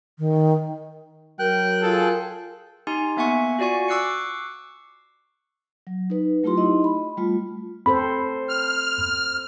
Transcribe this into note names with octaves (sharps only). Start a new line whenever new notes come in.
D#3
F#3 A#4 G5 F#6
F4 G#4 A4
D#4 G4 G#5 C6
A#3 B3 E5 F#5 G#5 C#6
F4 F#4 D5 G#5 C#6
C#6 D6 E6 F#6 C7 C#7
F#3
D#4 B4
F#3 A3 E4 F4 G4 C6
D#4 E4 D#5
B5
G3 A3 F4
C4 A4 C5 B5
F6